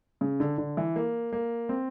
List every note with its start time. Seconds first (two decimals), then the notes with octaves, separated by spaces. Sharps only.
0.21 C#3
0.40 D3
0.58 D3
0.77 E3
0.96 A#3
1.33 A#3
1.69 C4